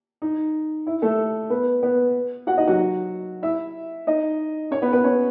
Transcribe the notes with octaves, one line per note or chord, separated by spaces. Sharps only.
D#4
E4
A3 A4
B3 B4
B3 B4
F#4 F#5
D#4 D#5
F#3 F#4
E4 E5
D#4 D#5
C#4 C#5
B3 B4
B3 B4
C#4 C#5